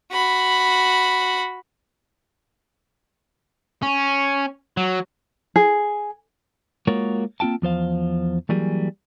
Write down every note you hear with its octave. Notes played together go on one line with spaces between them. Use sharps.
F#4 B5
C#4
F#3
G#4
G#3 A#3 F4 F#4 A#4 C#5
A#3 C4 F4 G5 A5
E2 F3 C5 F5
E3 F#3 G3 A#3 G#4